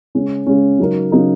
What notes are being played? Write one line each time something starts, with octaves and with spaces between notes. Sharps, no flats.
C#3 G#3 C#4
C#3 G#3 C#4
C#3 F#3 D#4 A#4
C#3 F#3 D#4 A#4